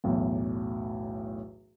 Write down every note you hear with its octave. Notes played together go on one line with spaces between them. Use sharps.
B1 E2 A2